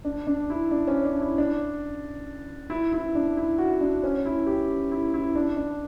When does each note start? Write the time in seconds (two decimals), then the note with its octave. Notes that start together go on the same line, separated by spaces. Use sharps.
0.05 D4
0.27 D4
0.50 E4
0.71 D4
0.87 C#4
1.05 D4
1.21 E4
1.38 D4
2.70 E4
2.93 E4
3.15 D4
3.37 E4
3.58 F#4
3.81 D4
4.04 C#4
4.25 E4
4.47 G4
4.92 E4
5.14 E4
5.36 D4
5.57 D4